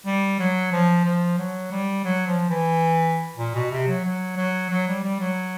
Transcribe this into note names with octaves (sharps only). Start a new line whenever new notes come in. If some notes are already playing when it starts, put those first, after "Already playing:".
G3
F#3
F3
F3
F#3
G3
F#3
F3
E3
A#2
B2
C3
F#3
F#3
F#3
F#3
G3
G3
F#3